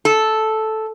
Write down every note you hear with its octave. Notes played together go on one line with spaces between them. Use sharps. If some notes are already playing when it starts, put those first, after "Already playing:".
A4